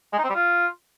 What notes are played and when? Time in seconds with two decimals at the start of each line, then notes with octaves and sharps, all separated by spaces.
0.13 G#3
0.19 D#4
0.24 C4
0.30 G3
0.35 F4